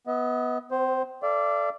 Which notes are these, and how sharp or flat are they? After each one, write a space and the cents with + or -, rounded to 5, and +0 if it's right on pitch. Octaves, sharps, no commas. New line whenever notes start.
B3 +0 D#5 +40
C4 -35 C5 +5
A4 +0 D5 -5 F5 -45